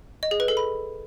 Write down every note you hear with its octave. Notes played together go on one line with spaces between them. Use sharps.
D#5
G#4
B4
A4
B5